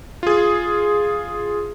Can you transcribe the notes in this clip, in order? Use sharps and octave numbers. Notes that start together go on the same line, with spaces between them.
F4 G#4